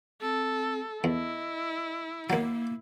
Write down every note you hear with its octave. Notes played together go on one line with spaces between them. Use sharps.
C4 A4
E2 E4 D#5
D#2 F#3 A#3